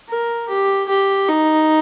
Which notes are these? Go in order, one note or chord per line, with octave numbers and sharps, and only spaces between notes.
A#4
G4
G4
D#4